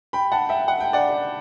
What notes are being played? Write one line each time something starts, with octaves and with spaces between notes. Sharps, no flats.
G5 B5
F#5 A5
E5 G5
F#5
G5
D5 F#5